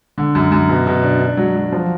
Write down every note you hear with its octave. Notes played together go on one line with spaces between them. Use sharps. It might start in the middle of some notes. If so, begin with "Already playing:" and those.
D3
F#2
F#2
B2
B2
D4
D4
F#3
F#3
F3